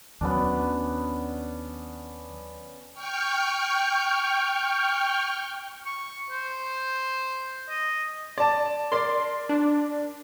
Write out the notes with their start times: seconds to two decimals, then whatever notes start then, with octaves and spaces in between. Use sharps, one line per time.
0.21 D#2 F#3 B3 C#4 D4
2.94 G5 C#6 F6 G6
5.86 C#6
6.30 C5
7.69 D#5
8.38 D5 A5
8.92 A#4 D5 C6
9.49 D4